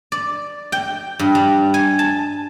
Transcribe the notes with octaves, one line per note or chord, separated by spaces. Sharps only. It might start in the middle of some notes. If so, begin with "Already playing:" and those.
D5
G5
G2
G3
G#5
A5